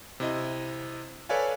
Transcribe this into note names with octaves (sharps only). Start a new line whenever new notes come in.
C3 E4 D#5
A4 B4 C#5 D5 F5 G#5